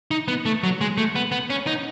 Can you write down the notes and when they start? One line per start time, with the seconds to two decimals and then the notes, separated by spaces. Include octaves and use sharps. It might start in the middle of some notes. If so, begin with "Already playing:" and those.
0.11 D#4
0.28 B3
0.46 A3
0.63 F#3
0.81 G#3
0.98 A3
1.16 B3
1.32 B3
1.50 C#4
1.67 D#4